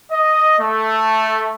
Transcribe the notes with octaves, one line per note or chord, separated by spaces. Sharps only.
D#5
A3